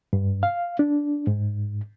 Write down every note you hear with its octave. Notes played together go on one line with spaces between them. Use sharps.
G2
F5
D4
G#2